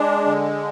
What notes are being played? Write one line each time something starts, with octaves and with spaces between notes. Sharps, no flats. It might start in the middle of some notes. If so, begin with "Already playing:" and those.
Already playing: G#3 D4
D3